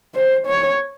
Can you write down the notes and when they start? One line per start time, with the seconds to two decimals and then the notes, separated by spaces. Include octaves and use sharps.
0.15 C5
0.46 C#5